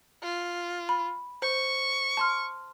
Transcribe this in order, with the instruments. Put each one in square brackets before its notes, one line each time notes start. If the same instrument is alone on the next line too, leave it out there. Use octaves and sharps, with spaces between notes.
[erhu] F4
[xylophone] B5
[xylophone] C5 [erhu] C#6
[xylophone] A5 C6 F6